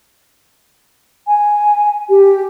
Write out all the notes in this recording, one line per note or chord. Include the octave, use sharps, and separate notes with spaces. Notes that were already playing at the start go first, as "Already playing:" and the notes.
G#5
G4